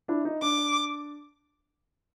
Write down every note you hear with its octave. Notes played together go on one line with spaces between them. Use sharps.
D4 E4
D#4
D4 D6